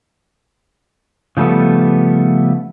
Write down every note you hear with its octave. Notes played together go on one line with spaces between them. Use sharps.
C#3 F3 G3 A3 B3